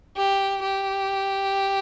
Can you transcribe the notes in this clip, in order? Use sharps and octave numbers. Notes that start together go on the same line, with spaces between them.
G4
G4